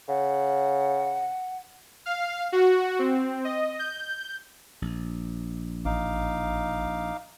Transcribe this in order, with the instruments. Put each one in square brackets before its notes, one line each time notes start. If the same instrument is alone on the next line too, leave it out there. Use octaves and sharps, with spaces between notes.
[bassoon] C#3 [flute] F#5
[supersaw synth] F5
F#4
C4
D#5
G6
[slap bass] A#1
[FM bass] A1 [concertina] D#4 F5 D6